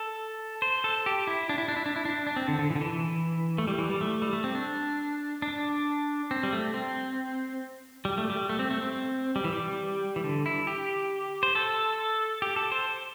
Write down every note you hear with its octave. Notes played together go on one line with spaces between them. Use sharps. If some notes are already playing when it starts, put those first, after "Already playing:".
Already playing: A4
C5
A4
G4
E4
D4
E4
D4
E4
D4
E4
D4
D4
C4
D3
D3
E3
D3
E3
A3
G3
E3
G3
A3
G3
A3
C4
D4
D4
C4
G3
A3
C4
G3
A3
G3
A3
C4
A3
C4
G3
E3
G3
E3
D3
E4
G4
C5
A4
G4
A4
C5